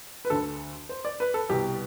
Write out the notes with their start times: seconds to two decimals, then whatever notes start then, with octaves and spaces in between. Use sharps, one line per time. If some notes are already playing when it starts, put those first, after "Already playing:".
0.25 B4
0.30 D2 D3 A4
0.89 C5
1.05 D5
1.20 B4
1.34 A4
1.49 C2 B2 G4